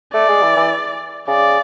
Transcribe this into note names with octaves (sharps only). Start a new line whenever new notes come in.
A3 D5
G#3
E3
E3
C#3 D5